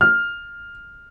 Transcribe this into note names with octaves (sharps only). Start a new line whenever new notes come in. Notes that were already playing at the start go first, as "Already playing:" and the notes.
F6